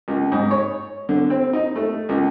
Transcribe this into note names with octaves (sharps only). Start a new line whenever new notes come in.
C#2
G#2
C#5
D3
C4
D#4
A3
C#2